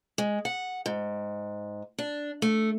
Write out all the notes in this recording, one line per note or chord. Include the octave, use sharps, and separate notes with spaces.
G#3
F#5
G#2
D4
A3